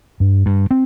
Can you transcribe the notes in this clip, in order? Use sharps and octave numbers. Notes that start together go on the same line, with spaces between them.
G2
G2
C4